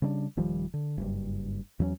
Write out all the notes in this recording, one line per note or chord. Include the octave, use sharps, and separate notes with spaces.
C#3 G3 C4 D4
D#1 D#3 F3 G3
D3
F#1 G2
E2 F#3 A#3 C#4